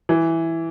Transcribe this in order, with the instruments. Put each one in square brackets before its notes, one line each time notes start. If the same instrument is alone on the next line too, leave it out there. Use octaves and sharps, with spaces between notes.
[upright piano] E3